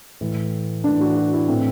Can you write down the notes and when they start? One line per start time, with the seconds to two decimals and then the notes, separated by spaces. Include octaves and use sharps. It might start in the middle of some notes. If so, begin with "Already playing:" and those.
0.21 A2 E3
0.84 A2 E3 D4
1.01 F#4
1.16 F#4
1.33 E4
1.48 A2 E3 C4